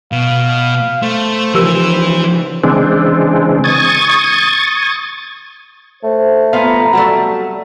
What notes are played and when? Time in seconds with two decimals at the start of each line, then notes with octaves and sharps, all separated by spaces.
0.12 B2 F5
1.02 A3 C5
1.54 C#3 E3 F3 G4 A#4 E6
2.64 C#3 E3 G#3 C4 D4
3.64 C#6 D#6 G#6 A6
6.03 A3 C5
6.53 F2 A#2 B3 F5 A#5
6.93 F#3 G3 A3 F#4